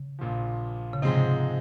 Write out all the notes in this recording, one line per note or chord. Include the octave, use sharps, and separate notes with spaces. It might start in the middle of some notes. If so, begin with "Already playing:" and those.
Already playing: C#3
A#1 A#2 F3
C#3
G#2 C3 F3 G#3 C4 D#4